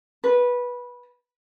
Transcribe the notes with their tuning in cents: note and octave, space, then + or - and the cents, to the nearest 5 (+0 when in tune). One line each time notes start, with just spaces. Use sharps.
B4 -15